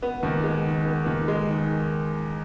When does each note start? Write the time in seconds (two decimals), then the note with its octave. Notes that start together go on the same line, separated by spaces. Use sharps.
0.02 B3
0.23 D#2
0.44 G#3
0.65 D#3
0.85 B3
1.06 D#2
1.28 G#3
1.48 D#3